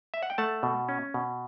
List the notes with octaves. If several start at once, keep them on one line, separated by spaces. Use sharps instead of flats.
E5
F#5
G5
A3 F#5 A5
B2
C#4
B2